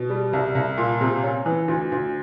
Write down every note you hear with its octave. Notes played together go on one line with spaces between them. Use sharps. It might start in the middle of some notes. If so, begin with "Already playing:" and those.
Already playing: B2
G3
C2
C2
A#2
C3
C#4
E3
D2
D2